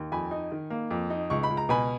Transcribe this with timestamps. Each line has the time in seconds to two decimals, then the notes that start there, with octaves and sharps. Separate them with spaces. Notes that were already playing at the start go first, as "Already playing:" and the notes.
Already playing: D#2
0.12 F2 G#5 B5
0.31 D#4
0.52 D#3
0.70 A#3
0.91 F2
1.10 D#4
1.30 C#2 C#6
1.43 B5
1.50 C#2
1.57 A#5
1.69 B2 G#5 B5